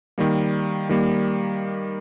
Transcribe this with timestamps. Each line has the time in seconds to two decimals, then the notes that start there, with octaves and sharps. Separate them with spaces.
0.18 D#3 G3 A#3
0.89 D#3 G3 A#3